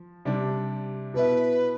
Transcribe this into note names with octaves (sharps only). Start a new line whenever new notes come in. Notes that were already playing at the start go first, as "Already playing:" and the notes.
Already playing: F3
C3 G3 D4
B2 B3 E4 B4